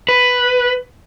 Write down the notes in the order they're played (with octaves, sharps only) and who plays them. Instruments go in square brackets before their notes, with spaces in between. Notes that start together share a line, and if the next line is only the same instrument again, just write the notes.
[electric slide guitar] B4